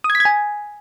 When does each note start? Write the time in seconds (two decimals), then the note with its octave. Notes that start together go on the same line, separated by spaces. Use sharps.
0.04 D#6
0.10 G#6
0.15 B6
0.20 G#6
0.25 G#5